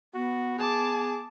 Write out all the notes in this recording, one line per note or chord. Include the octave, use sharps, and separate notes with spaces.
B3 F#4
G#4 A5 D6